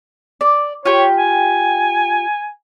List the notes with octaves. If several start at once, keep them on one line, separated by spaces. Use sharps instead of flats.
D5
F4 G4 C#5 G5
G#5